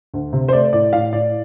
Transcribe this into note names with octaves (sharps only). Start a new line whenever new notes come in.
D2
C3
C5
A3 D5
A2 D5
A2 F5
A2 D5